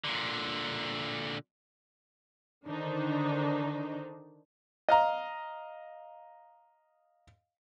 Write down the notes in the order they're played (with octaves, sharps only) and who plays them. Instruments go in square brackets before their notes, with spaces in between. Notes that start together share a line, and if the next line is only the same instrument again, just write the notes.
[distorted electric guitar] A#2 D3
[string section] D3 D#3 D4 D#4 C5
[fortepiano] D#5 F5 A#5